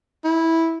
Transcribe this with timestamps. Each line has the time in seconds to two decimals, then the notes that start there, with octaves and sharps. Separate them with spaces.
0.24 E4